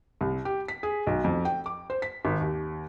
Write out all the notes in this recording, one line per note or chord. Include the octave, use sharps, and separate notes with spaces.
C2
G4
B6
G#4
B1
F2
G5
D6
C5
B6
G#1
D#2